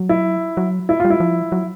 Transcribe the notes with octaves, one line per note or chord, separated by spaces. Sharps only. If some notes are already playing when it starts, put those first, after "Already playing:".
Already playing: F#3
E4
F#3
E4
F4
G3
E4
F3
F#3